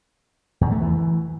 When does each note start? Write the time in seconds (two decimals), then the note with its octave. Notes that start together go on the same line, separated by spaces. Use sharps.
0.61 E2
0.71 A3
0.81 E3